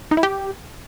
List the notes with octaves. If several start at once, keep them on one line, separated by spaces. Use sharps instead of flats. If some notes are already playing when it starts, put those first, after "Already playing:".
D#4
E4
G4